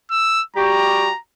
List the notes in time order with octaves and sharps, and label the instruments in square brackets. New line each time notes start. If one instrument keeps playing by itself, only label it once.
[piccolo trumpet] E6
[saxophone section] G3 F#4 G4 [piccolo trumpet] A#5